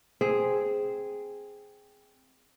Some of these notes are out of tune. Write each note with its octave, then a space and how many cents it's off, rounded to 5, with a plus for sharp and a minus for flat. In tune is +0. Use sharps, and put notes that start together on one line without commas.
C4 -5 G#4 +0